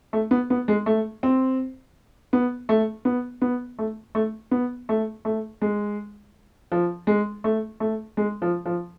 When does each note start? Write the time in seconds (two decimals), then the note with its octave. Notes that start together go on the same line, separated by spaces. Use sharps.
0.13 A3
0.31 B3
0.50 B3
0.68 G#3
0.86 A3
1.23 C4
2.33 B3
2.69 A3
3.05 B3
3.42 B3
3.79 A3
4.15 A3
4.51 B3
4.89 A3
5.25 A3
5.62 G#3
6.72 F3
7.07 G#3
7.44 A3
7.80 A3
8.17 G#3
8.42 F3
8.65 F3